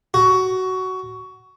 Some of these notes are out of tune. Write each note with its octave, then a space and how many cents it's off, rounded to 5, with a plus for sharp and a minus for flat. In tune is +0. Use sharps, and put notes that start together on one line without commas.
F#4 +15